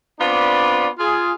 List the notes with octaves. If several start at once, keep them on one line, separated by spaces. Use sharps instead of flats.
B3 C4 D4 F4 B4 D5
F4 G#4